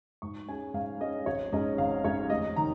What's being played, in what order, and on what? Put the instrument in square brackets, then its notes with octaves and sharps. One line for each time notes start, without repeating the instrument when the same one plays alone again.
[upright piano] G#2 C#6
G#3 C#4 G#5
G#2 F5
G#3 C#4 D#5
G#1 C#5
G#2 G#3 C#4 D#5
G#1 F5
G#2 G#3 C#4 C#5
F1 D#5
D#3 A#5